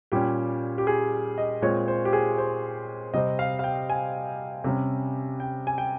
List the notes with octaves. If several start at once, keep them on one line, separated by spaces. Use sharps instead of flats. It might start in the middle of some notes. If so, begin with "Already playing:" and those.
A#2 G3 C#4 G4
G4
G#4
D#5
A#2 G#3 C4 C#5
C5
G4
G#4
C5
C3 G3 C4 D#5
F5
F5
G5
G#5
C3 G3 C#4
G5
G#5
G5